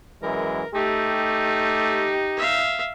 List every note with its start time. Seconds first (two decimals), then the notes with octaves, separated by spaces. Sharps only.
0.23 F#2 E3 G#3 A#4
0.75 A3 D#4 G4
2.37 E5 F5